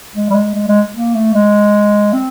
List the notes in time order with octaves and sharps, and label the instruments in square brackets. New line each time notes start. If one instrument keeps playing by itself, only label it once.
[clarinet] G#3
G3
G#3
G#3
G#3
A#3
A3
G#3
C4